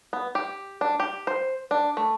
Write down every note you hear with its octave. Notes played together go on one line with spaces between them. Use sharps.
B3
G4
D4
G4
C5
D4
A3